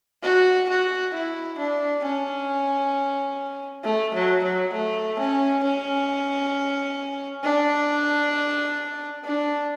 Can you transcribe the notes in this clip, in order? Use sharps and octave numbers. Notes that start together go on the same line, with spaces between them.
F#4
F#4
E4
D4
C#4
A3
F#3
F#3
A3
C#4
C#4
D4
D4